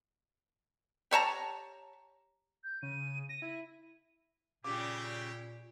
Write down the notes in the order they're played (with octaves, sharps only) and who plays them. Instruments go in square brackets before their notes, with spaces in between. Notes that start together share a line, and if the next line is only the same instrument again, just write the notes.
[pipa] G4 C#5 A5 A#5
[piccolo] G6
[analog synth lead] C#3 [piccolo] D#7
[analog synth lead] A#6 [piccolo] D#7
[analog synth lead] E4
[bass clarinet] A#2 [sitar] C#3 G3 [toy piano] C#4 D6 [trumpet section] E4 G4